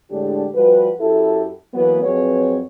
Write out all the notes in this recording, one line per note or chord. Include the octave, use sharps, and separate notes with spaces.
A2 D3 G#3 D4 G4
F3 G3 F#4 B4
F#2 E4 G4 A4
E3 F#3 A#3 B3
F2 F#3 C4 G#4 B4 C#5